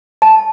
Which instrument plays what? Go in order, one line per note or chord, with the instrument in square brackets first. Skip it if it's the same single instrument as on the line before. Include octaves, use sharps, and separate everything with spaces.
[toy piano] A5